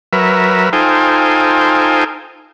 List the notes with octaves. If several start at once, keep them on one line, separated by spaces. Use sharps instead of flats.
F#3 A#4 B4 E5
D#4 F4 A4 C5 G5 G#5